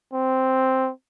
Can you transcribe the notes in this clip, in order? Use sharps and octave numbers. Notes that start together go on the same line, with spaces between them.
C4